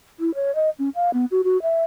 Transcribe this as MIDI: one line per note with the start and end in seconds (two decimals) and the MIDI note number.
0.20 0.34 64
0.35 0.54 73
0.55 0.70 75
0.79 0.89 61
0.95 1.10 77
1.14 1.25 59
1.31 1.42 66
1.44 1.61 66
1.62 1.84 76